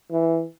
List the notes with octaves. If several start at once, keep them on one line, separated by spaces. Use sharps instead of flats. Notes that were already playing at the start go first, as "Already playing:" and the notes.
E3